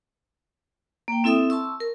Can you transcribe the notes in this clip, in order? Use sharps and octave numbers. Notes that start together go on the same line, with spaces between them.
A#3 G5
C4 E4 A4 E5 D#6
A5 C6 C#6 E6
A#4